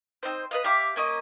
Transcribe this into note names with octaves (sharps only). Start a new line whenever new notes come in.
C4 D#4 C5
B4 D#5 F5
G4 E5 F5 D6
A#3 C#4 D#5